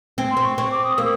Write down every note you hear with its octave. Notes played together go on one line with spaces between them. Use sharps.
C4
C6
C4
C#6
C4 C#6
D6
D#6
A#3 E6